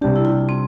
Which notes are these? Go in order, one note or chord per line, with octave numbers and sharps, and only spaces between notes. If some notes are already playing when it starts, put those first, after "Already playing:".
C3 G3 D4 G4
E4
F4
C4